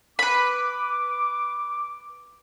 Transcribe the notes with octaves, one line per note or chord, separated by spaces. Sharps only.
B4 B5 D6